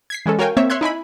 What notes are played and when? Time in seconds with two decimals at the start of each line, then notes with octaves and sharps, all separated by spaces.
0.10 G#6 B6 C7
0.26 E3 G#3 C#4 A4
0.39 F#4 A#4 C#5 F5 G5 G#5
0.57 A#3 C4 C#5 E5
0.70 C#5 E5 C6 F#6 G#6
0.81 D#4 E4 G#5 B5